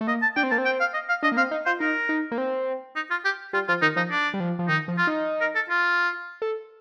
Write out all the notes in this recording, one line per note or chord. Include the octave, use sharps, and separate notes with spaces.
A3
A#3 D#5
A5
D4 G5
C4
A#3 A5
C4
G5
F5
D#5
F5
D4 D#5
A#3
C4 F5
D#4
F4 C5
D#4 A#4
D#4
A#3
C4
D#4
F4
G4
G3 F4
F3 F4
D#3 D#4
F3 D#4
D4
G3
F3
F3
D#3 D#4
F3
F4
D#4
A#4
A4
F4
A4